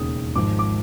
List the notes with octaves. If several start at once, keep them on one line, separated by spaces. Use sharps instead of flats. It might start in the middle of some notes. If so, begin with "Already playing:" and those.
Already playing: E1 D#2 C#3 D#6
G#1 G#2 F3 D6
D6